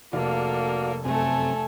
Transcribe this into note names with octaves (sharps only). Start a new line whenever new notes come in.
F1 A#3 F#4 A4 D5 F5
F#2 C3 A3 C4 A4 G#5